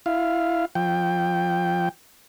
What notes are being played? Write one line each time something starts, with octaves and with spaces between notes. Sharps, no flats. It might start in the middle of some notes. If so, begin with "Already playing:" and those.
E4 F5
F3 G5